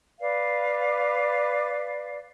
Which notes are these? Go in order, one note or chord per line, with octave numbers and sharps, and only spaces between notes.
B4 D5 F5